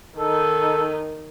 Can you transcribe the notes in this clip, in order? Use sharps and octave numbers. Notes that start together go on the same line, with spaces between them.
D#3 D#4 A4